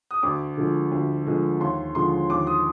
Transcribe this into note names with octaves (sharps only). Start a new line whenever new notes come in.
D#6
D2 D6
D3 F3 G#3
D2
D3 F3 G#3
D#2 C6
D3 F3 G#3 C6
D#2 D6
D#6